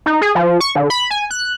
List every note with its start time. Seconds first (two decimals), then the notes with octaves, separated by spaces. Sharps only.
0.06 D#4
0.21 G#4
0.35 F3
0.61 C#6
0.75 D3
0.90 B5
1.11 G#5
1.31 F#6